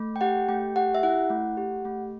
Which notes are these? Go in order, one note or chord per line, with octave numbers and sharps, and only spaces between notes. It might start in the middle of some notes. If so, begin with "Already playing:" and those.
Already playing: A3
G5
G4 F#5
A3 G5
G4 F#5
E5
E4 F#5
A3
G4
A3